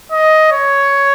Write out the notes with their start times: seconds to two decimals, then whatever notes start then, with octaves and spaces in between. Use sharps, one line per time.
0.12 D#5
0.52 C#5